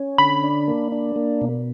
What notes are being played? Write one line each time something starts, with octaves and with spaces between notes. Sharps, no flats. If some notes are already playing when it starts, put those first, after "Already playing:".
Already playing: C#4
D3 B5
D4
A#3
D4
A#3
B2